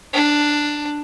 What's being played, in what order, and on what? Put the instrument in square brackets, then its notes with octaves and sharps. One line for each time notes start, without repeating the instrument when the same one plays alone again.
[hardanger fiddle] D4